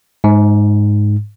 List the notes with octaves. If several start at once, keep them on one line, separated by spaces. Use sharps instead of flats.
G#2